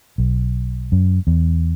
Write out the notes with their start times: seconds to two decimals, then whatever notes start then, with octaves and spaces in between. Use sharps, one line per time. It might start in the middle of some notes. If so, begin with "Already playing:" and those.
0.18 B1
0.92 F#2
1.27 E2